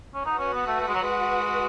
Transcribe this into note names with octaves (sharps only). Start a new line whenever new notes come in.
C#4
D#4 F#4 B4 F#5
C#4
B3
A3
A3
G#3
F#3
G#3